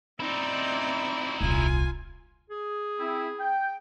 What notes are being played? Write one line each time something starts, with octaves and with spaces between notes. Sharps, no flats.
C4 D#4 E4 D5
D#1 C2 F4 G#5
G#4
C4 E4
G5